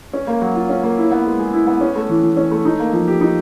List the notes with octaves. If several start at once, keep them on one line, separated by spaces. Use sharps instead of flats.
C#4
A#3
F#3
F4
C#4
A#3
E4
B3
G#3
G#4
E4
B3
C#4
A3
E3
E3
C#4
A3
D#4
A#3
F3
G4
D#4